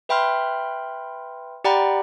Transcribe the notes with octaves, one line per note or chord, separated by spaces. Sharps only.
B4 E5 G5 B5 C6 F6
G4 D5 F#5 G5 A#5 B5